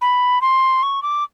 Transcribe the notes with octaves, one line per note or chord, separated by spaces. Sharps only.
B5
C6
C#6
D6